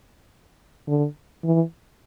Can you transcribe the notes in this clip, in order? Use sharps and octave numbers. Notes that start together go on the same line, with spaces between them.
D3
E3